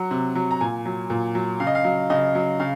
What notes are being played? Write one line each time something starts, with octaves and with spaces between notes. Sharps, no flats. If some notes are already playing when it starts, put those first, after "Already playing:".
Already playing: F#3 F#5
C3
F#3
A#5
A#2 G#5
F#3
A#2
F#3
C#3 F5
D#5
F5
F#3
C#3 D#5
F#3
C#3 F5